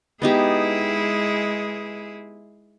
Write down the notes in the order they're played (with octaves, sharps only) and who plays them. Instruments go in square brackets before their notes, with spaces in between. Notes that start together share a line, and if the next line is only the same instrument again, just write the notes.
[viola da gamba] G#3 E4 G#4 [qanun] B3 D#4 G4